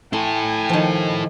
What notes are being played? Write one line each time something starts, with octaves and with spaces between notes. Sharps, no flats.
E4 A4 G5 G#5 C6
D#3 F3